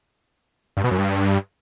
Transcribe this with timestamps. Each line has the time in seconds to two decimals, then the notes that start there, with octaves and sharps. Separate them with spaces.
0.77 G2
0.84 B2
0.91 F#2
0.98 G2